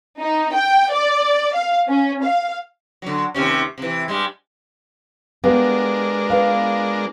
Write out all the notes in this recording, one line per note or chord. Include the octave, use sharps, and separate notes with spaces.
D#4
G5
D5
F5
C#4
F5
D3 F#3
D#2 C3 C#4
C3 E3
G2 G3 G#3
G#3 B3 D4 G4 A#4 F5
F4 B4 F5